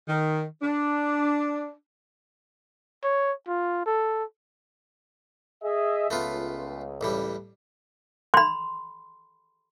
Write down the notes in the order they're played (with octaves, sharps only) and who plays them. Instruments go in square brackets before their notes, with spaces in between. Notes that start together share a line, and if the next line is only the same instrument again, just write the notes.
[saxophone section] D#3
D4
[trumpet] C#5
F4
A4
[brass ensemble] G#4 D#5 E5
[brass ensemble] C#2 [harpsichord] A3 B3 F4
[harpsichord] A1 A2 G3
[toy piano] B5 C6